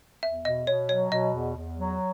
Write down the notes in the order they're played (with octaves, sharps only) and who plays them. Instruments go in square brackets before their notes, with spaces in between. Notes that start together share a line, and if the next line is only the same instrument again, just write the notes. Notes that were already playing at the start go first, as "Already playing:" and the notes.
[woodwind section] E2 [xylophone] E5
[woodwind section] B2 [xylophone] D#5
[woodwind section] B2 [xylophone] C#5
[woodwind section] F#3 [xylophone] C#5
[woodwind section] B2 [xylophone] D#5
[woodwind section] E2
E2
F#3